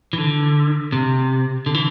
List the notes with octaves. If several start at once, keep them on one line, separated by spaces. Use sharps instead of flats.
E3
D3
C3
D3
E3